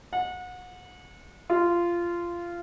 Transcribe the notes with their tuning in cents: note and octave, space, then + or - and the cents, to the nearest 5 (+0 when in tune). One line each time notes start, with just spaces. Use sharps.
F#5 -30
F4 -15